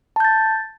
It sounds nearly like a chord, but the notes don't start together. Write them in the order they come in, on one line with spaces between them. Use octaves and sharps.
A5 G6 A6